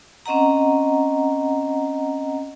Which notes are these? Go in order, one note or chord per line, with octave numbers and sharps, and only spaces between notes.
C4 C#4 D#5 F#5 A#5